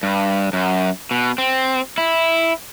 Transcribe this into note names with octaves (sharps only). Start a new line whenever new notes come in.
G2
F#2
B2
C4
E4